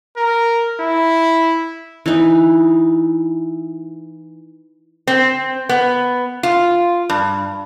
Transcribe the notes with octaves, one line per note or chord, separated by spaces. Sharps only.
A#4
E4
E3 D#4
C4
B3
F4
G2